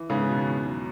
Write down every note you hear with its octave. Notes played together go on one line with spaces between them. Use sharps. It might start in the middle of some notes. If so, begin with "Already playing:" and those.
Already playing: E3
G#2 C#3 B3
B2
E2
F#3